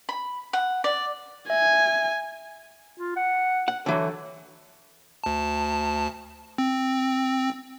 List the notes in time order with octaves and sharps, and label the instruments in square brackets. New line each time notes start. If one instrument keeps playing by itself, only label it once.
[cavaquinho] B5
F#5
D5
[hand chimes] E5 [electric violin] G#5
[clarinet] F4
F#5
[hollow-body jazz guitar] F#5
[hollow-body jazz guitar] D3 E3 F#3 [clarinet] A4
[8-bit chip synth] D2 A5
C4